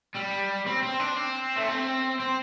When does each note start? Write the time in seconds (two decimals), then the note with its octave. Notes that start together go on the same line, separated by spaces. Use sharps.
0.15 G3
0.66 C4
0.83 C4
1.00 D4
1.17 C4
1.56 A3
1.68 C4
2.20 C4